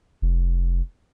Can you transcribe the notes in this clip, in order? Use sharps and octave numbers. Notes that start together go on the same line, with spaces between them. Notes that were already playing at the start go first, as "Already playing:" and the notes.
F1